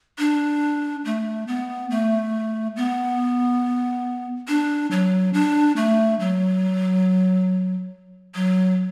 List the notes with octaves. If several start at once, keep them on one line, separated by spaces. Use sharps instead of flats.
D4
A3
B3
A3
B3
D4
F#3
D4
A3
F#3
F#3